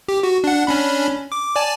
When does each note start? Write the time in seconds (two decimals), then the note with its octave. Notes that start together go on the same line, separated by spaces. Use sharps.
0.08 G4
0.23 F#4
0.44 D4 F#5
0.67 C#4 D4 B5
1.32 D6
1.56 D5 G#5 A5